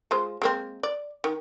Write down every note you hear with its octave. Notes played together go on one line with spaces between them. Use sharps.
G#3 F4 C5
G#3 A#3 C4
D5
D#3